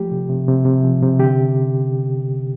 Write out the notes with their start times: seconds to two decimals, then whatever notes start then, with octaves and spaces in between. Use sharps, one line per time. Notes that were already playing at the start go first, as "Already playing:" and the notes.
Already playing: F3 A3 G4
0.11 C3
0.29 C3
0.48 C3
0.65 C3
0.83 F3
1.02 C3
1.19 D3 G4